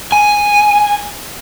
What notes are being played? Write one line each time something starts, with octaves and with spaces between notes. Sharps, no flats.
G#5